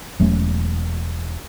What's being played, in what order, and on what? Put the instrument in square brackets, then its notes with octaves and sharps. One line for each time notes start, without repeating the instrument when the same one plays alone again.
[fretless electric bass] E1 F#3 A3 C#4